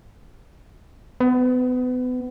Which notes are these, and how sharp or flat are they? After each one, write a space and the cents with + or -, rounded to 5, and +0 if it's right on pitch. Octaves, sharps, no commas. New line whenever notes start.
B3 +30